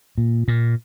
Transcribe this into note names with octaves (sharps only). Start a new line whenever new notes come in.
A#2
A#2